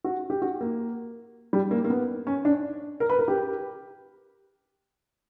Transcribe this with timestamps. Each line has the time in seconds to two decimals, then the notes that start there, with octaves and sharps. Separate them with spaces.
0.04 F#4
0.30 G4
0.42 F#4
0.61 A#3
1.53 G3
1.71 A#3
1.84 A#3
1.90 B3
2.27 C#4
2.45 D4
3.00 A#4
3.10 B4
3.19 A#4
3.28 G4